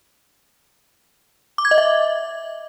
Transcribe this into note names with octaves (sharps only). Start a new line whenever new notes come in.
D6
G#6
D#5
E5